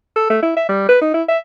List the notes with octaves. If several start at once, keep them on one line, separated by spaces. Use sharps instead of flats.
A4
A3
E4
E5
G3
B4
D#4
E4
E5